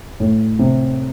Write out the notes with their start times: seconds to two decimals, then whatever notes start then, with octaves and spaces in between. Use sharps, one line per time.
0.20 A2
0.59 C3